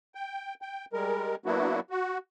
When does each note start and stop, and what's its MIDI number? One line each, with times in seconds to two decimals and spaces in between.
0.15 0.54 79
0.62 0.85 79
0.93 1.35 55
0.93 1.35 56
0.93 1.35 70
1.46 1.80 54
1.46 1.80 58
1.46 1.80 59
1.46 1.80 62
1.46 1.80 64
1.46 1.80 66
1.90 2.18 66